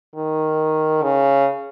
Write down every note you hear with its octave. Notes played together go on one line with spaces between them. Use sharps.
D#3
C#3